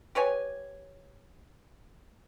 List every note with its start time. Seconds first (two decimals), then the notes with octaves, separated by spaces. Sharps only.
0.15 G4 B4 C#5 G#5